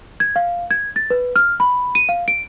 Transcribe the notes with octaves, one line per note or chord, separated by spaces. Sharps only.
G#6
F5
G#6
A6
B4
F6
B5
D#7
F5
D7